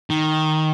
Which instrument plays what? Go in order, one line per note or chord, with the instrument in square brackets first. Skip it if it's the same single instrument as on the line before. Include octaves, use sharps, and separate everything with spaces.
[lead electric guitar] D#3